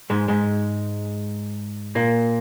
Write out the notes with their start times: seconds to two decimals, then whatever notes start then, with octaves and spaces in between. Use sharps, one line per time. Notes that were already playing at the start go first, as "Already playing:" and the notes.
0.10 G#2 G#3
0.28 G#2 G#3
1.95 A#2 A#3